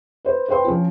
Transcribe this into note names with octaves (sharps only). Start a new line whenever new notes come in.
B4 C5
B4 C5 G5 C6
F3 C#4 F4